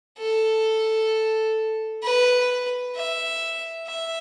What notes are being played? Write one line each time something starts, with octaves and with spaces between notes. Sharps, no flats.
A4
B4
E5
E5